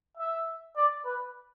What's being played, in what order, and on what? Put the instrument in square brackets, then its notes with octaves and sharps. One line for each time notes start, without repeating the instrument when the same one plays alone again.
[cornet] E5
D5
B4